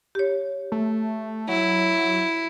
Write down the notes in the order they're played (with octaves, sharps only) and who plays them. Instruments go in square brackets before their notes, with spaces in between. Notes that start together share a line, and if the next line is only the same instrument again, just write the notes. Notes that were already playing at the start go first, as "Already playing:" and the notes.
[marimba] G4 C#5
[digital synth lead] A3
[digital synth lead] F#3 [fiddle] E4